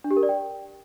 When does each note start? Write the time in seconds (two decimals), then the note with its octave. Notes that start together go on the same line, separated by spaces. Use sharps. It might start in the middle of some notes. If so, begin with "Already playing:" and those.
0.04 D4
0.11 G4
0.17 A#4
0.23 D5
0.29 G5